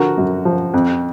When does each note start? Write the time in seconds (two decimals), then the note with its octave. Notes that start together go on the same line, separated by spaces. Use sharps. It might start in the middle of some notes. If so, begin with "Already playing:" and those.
Already playing: D3 F3 F#4 A#4
0.18 F#2
0.45 F3
0.74 F2